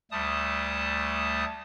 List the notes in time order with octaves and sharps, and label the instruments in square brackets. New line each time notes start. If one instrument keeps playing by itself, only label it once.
[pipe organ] D2 G3 A3 A5 D#6